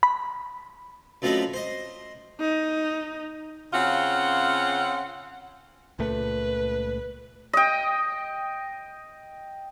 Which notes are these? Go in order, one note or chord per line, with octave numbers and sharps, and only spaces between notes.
B5
F#2 F3 A3 C4 D#5 B5
C5 D#5
D#4
C#3 C4 C#4 F4 F5 F#5
C#2 A#2 A3 B4
D#5 G5